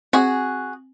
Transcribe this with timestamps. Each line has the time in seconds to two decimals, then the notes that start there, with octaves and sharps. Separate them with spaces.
0.13 C4 F#4 G#4 G#5